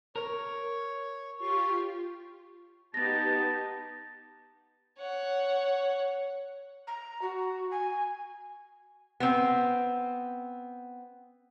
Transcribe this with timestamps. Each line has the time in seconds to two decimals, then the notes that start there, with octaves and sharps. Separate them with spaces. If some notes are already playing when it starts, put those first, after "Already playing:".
0.16 A#4 C#5
1.39 F4 G4 C6 C#6
2.94 B3 D#4 G4 A5 A6 A#6
4.98 C#5 F#5
6.87 A#5
7.22 F#4
7.71 G#5
9.20 B3 C4